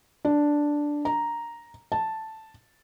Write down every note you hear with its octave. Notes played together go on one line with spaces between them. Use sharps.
D4
A#5
A5